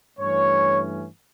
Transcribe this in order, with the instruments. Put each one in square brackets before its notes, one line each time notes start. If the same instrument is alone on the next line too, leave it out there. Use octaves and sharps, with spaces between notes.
[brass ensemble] G2 E3 A3 C#4 C#5